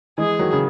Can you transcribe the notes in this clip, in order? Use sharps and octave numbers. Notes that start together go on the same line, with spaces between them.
E3 G#3 G#4
D#3 F#3
C#3